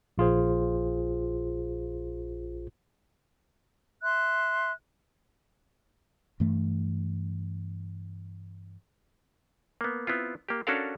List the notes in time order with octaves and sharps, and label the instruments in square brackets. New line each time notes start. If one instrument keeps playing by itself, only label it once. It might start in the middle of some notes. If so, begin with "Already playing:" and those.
[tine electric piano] A#1 F4 G#4 C5
[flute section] E5 C6 F#6
[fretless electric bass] G2 E3 A3
[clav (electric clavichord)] A#3 B3
B3 C4 E4 F4
A#3 G4
C#4 D4 F#4 A4 A#4 F5